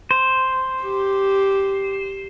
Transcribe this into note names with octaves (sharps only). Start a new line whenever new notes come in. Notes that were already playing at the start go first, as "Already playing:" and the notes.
C5
G4